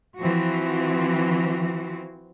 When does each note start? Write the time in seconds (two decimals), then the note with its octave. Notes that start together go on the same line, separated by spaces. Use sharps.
0.18 E3 F3 C4 F#4